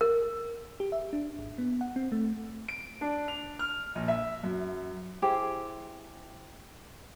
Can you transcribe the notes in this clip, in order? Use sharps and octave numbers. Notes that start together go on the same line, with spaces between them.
A#4
G4
E5
D4
G#1
B3
F#5
C4
A3
D7
D4
F7
F6
A#1
E5
F#2
E4 G4 G#4 C5